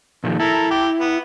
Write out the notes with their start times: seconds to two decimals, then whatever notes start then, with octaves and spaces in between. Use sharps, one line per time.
0.24 A#2 D#3 F3
0.40 E4 A4 A#4
0.71 G4
1.00 B3